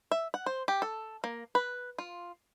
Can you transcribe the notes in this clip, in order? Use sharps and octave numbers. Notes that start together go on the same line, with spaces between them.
E5
F#5
C5
G4
A4
A#3
B4
F4